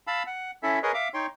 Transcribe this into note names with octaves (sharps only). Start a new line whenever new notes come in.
F5 A5 B5 E6
F#5
C#4 E4 A4 E5
G#4 A#4 B4 C#5 D#5
E5 F5 D6
D#4 C#5 G5 C6